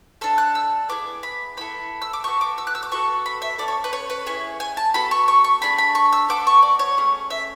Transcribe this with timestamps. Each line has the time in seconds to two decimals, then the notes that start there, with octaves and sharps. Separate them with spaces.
0.21 D4 A4 E6
0.38 F#6
0.55 E6
0.89 B3 E4 G#4 D6
1.23 B5
1.57 B3 E4 A4 B5
2.02 E6
2.13 D6
2.24 B3 F#4 A4 C#6
2.41 D6
2.58 E6
2.67 F#6
2.75 E6
2.83 D6
2.91 B3 F#4 A4 C#6
3.26 B5
3.42 E5
3.58 C#4 F#4 A4 D5
3.68 C#5
3.84 B4
3.93 C#5
4.10 B4
4.26 C#4 E4 G#4 C#5
4.60 G#5
4.77 A5
4.94 B3 F#4 A4 B5
5.11 C#6
5.28 C#6
5.44 C#6
5.62 A3 D4 G#4 B5
5.78 B5
5.95 C#6
6.13 E6
6.29 B3 F#4 A4 D6
6.47 C#6
6.62 D5
6.79 C#5
6.97 A3 C#4 G#4
7.30 E5